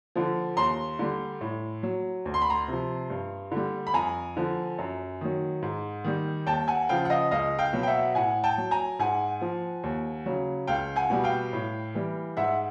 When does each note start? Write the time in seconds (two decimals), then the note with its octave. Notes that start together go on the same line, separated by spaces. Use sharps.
0.16 D3 F3
0.57 D#2 A#5 C6
0.99 D3 G3
1.41 A2
1.83 F#3
2.25 D2
2.34 C6
2.42 B5
2.50 A#5 C6
2.68 C3 F3
3.10 G2
3.52 D3
3.57 G3
3.87 B5
3.94 F2 G#5 A#5
4.37 D3 F3
4.79 F#2
5.21 D#3 F#3
5.62 G#2
6.04 D#3 G3
6.46 D#2 G5 A5
6.68 F#5 G#5
6.89 C#3 F3 F5 G5
7.05 F#5
7.10 D#5 F5
7.31 C#2 D#5 F5
7.59 F5 G5
7.73 B2 F#3
7.83 G5
7.87 E5 F#5
8.15 A2 F#5 G#5
8.44 G5 A5
8.58 F#3
8.71 G#5 A#5
8.99 G#2 F#5 G#5
9.42 F3
9.83 D#2
10.26 C#3 F#3
10.68 C#2 F5 G5
10.96 F#5 G#5
11.10 B2 G3
11.24 F5 G5
11.53 A2
11.95 E3 G3
12.37 G#2 E5 F#5